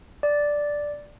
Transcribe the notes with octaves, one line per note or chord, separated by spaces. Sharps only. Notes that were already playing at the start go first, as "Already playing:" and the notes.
D5